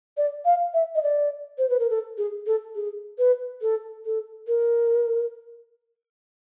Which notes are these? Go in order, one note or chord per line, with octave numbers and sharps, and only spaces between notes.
D5
F5
E5
D#5
D5
C5
B4
A#4
A4
G#4
A4
G#4
B4
A4
A4
A#4